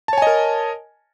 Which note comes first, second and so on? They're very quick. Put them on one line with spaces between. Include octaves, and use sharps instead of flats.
A5 C#5 G#5 D#5 A#4